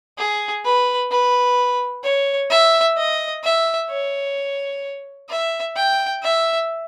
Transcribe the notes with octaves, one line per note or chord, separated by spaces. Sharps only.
G#4
B4
B4
C#5
E5
D#5
E5
C#5
E5
G5
E5